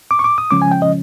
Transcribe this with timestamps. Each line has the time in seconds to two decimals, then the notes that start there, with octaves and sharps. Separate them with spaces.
0.11 D6
0.19 C#6
0.24 D6
0.38 D#6
0.51 C#3 F3 G#3 C#4 D6
0.62 G#5
0.71 G5
0.82 D#5